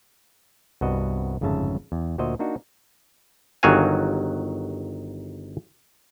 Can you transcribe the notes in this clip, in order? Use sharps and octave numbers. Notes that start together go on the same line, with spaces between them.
C2 G2 B3 F#4 D#5
G1 F2 G#2 C#3 E5 A5
E2
D2 A#2 F#4 C5 D#5 E5
A#3 D4 D#4 F#4
G1 D#3 F#3 F#4 F5 G#5